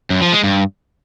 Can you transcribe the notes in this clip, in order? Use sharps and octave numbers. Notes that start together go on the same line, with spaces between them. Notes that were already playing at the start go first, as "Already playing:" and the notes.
F#2
F3
G#3
G2